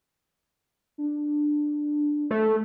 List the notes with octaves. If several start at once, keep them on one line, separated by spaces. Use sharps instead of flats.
D4
A3